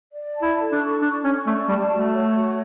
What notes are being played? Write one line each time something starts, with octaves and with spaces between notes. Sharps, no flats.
D5
A5
E4
A4
D4
C#6
D4 C#6
C#4 C#6
A3 D5
G3 A5
A3 F#4
C#5
F#4